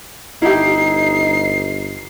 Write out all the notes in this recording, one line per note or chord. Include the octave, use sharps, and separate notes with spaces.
G1 D#4 E4 G4 C7